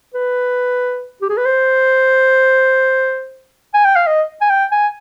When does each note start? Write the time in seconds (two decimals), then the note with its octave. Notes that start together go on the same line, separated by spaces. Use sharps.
0.14 B4
1.22 G4
1.29 G#4
1.37 B4
1.45 C5
3.74 G#5
3.85 G5
3.96 F5
4.07 D#5
4.41 G#5
4.50 G5
4.72 G#5